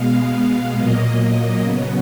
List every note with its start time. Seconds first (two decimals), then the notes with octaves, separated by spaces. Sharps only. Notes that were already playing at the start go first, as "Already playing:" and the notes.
Already playing: B2 G#3 B3 F5
0.76 A#2 F#3 A#3 D#5
1.18 D#5
1.60 C#3 F#3 B3